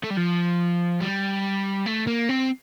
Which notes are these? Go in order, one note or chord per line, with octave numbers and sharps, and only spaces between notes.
A3
G3
F3
G3
A3
A#3
C4